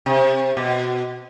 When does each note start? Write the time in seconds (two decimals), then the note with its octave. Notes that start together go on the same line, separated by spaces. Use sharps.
0.06 C3
0.57 B2